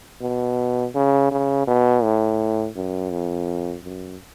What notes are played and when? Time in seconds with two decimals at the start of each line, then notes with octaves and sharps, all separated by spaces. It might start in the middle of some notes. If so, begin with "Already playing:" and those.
0.21 B2
0.95 C#3
1.31 C#3
1.67 B2
2.03 A2
2.76 F#2
3.11 F2
3.84 F#2